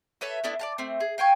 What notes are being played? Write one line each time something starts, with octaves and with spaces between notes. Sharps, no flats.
A4 B4 C#5 E5
A3 B3 D4 E4
D5 F5 A5
A3 C4
G#4
F5 G5 G#5 C#6